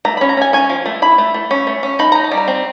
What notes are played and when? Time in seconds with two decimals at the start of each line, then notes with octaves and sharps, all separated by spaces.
0.05 A3 A#5
0.17 B5
0.21 C#4
0.29 A#5
0.37 C#4 G#5
0.53 C#4 G#5
0.69 F3
0.86 A3
1.02 E4 B5
1.18 A3
1.34 A3
1.51 C#4
1.67 A3
1.83 C#4
1.99 D#4 B5
2.12 D#4 A#5
2.24 A5
2.32 G3
2.37 A#5
2.48 C4